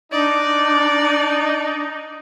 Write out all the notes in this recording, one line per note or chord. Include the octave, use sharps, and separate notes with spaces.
D4 D#4 D5